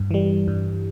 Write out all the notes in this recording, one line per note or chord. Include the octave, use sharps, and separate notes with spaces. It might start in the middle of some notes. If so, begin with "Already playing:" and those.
Already playing: G2
E3 G3
G2